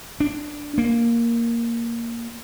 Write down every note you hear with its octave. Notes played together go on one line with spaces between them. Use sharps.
D4
A#3